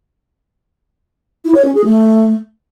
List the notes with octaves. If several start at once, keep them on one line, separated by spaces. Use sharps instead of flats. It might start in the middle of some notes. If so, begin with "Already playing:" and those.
E4
C#5
C#4
G#4
A3